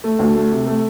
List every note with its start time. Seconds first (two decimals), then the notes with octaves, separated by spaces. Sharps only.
0.04 A3
0.19 D2
0.34 A3
0.51 C3
0.67 A3